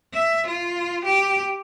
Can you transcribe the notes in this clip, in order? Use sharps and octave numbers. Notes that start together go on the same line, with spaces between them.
E5
F4
G4